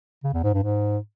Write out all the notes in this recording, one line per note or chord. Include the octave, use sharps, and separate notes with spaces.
C#3
E2
G#2
G2
G#2